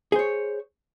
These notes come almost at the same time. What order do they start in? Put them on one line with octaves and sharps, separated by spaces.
G#4 C5 C#5